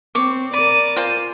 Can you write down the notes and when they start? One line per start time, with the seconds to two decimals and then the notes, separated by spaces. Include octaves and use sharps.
0.15 C4 C#5 D6
0.53 A#4 D5 B5 D#7
0.96 F4 C5 G#5